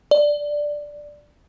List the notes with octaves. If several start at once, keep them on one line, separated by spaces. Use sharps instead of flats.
D5